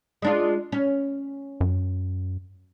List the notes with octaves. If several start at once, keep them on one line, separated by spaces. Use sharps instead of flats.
G#3 D4 F4
C#4
F#2